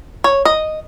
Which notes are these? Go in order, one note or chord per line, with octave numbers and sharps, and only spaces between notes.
C#5
D#5